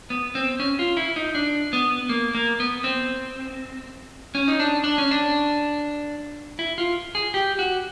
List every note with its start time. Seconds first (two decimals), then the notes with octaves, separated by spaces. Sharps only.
0.10 B3
0.35 C4
0.60 C#4
0.79 F4
0.97 E4
1.16 D#4
1.35 D4
1.73 B3
2.09 A#3
2.35 A#3
2.60 B3
2.84 C4
4.35 C#4
4.48 D#4
4.60 D4
4.84 D4
4.98 C#4
5.11 D4
6.59 E4
6.78 F4
7.15 G#4
7.34 G4
7.59 F#4